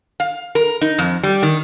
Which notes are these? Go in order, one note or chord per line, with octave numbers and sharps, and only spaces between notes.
F5
A#4
D#4
F2
G3
D#3